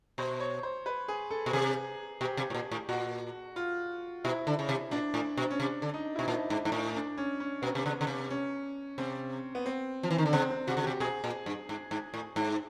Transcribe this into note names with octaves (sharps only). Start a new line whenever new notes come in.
B2 C5
C#5
C5
B4
G#4
A4
B2
C3 G#4
B2 G4
C3
A2
A#2
A2
A#2 F#4
F4
B2 E4
D3
C#3
C3
A#2 D4
A2
B2
C#4
C3 D4
D3
D#4
B2 E4
A#2 D#4
G#2
G#2
A2
D4
C#4
C#4
B2 B3
C3
C#3
C#3
C3
C#4
C3 C4
B3
C4
F3
E3
D#3
D3
C#3 C4
C4
C3 F#4
C#3
C3 G4
B2 G#4
A#2
G2
G#2
G#2
A2
G#2